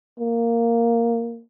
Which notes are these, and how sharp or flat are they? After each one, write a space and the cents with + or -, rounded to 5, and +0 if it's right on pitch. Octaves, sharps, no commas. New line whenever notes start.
A#3 -5